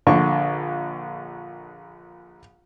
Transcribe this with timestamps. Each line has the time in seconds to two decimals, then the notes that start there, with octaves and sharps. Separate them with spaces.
0.07 A#1 D3 C#6